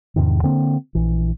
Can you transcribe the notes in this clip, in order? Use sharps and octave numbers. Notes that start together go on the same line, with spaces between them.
E2 G#2 C3 D#3
D3 A#3 C4
A#1 E3